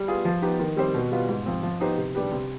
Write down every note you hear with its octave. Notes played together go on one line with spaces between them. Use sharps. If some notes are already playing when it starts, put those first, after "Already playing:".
Already playing: G3
B3 F4 G#4
F3
B3 D#4 G4
D#3
G3 C4 G4 C5
B2
G3 B3 F4
G#2
F3 C4
F3
B3 D#4 G4 C5
C3
G3 D4 G4 B4
C3